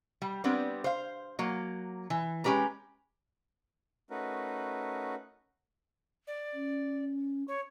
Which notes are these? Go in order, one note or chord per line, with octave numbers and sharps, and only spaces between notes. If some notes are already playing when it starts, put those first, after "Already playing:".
G3
G3 B3 C4 D4
C5 F5
F#3 A#3
E3
G#3 C#4 G4 B4 A#5
A3 C#4 D#4 F#4 A#4 B4
D5
C#4
C#5 C#6